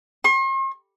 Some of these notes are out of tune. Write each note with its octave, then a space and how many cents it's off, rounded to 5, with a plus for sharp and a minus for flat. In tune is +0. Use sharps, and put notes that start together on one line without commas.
C6 +45